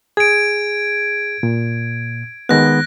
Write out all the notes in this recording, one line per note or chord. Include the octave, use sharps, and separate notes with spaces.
G#4 G#6 D7
A#2
D#3 G#3 B3 F#6 A#6